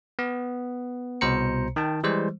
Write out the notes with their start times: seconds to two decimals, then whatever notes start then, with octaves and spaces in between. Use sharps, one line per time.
0.19 B3
1.21 C2 B2 C5 A#5 C#7
1.76 D#3 G5 A5
2.03 E3 G3 G#3 C5